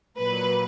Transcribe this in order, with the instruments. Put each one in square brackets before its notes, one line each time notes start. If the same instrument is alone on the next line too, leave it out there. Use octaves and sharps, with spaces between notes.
[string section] A#2 F#3 B4